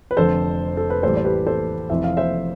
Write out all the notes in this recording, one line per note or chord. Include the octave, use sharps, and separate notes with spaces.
B4
F1 F2 D3 A4 C5
A4
B4
A1 A2 E3 G3 A4 C5
C5
G4 B4
A4 C5
F1 F2 E3 E5
F5
C5 E5